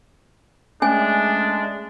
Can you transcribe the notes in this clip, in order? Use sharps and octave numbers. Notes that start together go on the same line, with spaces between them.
G#3 A3 C#4 D4 G#5